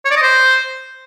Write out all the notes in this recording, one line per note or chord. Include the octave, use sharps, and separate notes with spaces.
C#5
D5
D#5
C5